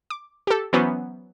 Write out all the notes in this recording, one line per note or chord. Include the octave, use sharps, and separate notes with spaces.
D6
G4 A4
E3 F#3 B3 C#4 C5